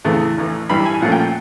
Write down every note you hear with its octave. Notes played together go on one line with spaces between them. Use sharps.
E2 C#3 E3 A3 C4
A1 A2 E3
G2 E3 G3 B5
G#5
A#2 F3 A3 C#4 F#5
G5